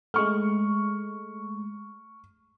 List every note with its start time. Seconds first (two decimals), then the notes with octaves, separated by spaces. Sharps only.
0.14 G#3 A3 C#6 F6